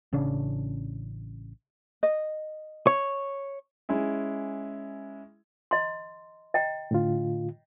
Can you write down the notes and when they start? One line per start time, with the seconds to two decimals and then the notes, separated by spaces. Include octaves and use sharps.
0.13 A1 C#3 C#4 D4
2.03 D#5
2.87 C#5
3.89 G#3 C#4 E4
5.71 D#5 A#5 C6
6.54 D#5 G5 A#5
6.91 A2 D3 F4